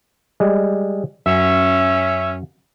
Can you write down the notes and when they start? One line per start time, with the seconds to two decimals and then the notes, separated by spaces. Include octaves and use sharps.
0.40 G3 G#3
1.26 F#2 C#4 E5